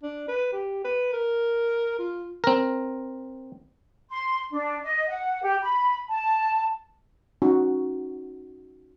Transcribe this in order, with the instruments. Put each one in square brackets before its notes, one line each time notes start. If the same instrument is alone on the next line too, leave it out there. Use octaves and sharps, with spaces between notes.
[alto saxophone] D4
B4
G4
B4
A#4
F4
[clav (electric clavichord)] C4 A#4
[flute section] C6
D4
D#5
F#5
G4
B5
A5
[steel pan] C#4 D#4 F#4